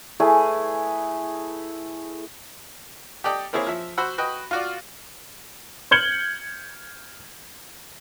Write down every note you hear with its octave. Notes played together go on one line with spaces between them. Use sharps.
A3 E4 G#4 B4
G4 A4 D5 D#5 G5
A#3 C4 E4 G#4 C#5
F3 E5
F#4 C5 F#5 B5 E6
F#4 B4 D#5 G5
F4 F#4 D5
F6 G6 G#6 C#7 F#7 G7